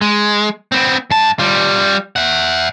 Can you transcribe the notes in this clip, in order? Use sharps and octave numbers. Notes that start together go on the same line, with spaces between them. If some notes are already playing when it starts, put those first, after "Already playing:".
G#3
B3 C4
G2 A5
G3 F4
E5 F#5